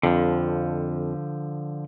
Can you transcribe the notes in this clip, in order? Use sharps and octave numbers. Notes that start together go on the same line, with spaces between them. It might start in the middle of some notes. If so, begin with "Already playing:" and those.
F2 D3 F3